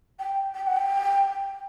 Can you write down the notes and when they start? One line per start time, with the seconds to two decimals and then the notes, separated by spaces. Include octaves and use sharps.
0.20 G5
0.55 G5
0.67 F#5
0.77 G5